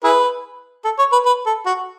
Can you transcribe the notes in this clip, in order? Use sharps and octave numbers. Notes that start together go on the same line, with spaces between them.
E4 G#4 B4
A4
C#5
B4
B4
A4
F#4